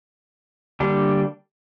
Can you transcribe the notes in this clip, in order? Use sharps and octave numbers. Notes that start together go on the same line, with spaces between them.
D3 G3 A#3 D4 G4